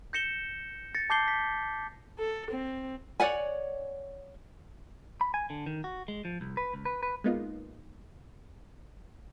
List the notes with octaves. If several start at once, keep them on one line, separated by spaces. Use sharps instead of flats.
G6 A#6 C#7 E7 G7
A6 A#6 C#7
A5 D6 G6 C7 G7
B6
A4
C4
C#5 D5 F#5 G#5
B5
G#5
D3
D#3
F#4
G#3
F3
C2
B4
C#2
B4
B4
G#3 A#3 B3 D#4 F4